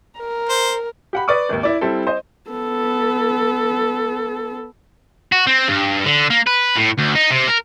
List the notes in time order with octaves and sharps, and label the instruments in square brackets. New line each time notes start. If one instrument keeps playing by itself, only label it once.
[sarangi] A#4
[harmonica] C5
[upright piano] G4 F#5 B5
B4 D5 C#6 D#6
G#1 D#2
E4 D5
G3 C4 E4 A4
C5 D#5
[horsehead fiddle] B3 A4
[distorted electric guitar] F#4
C4
G2
D3
A#3
B4
A2
D2
D#4
C3
A#4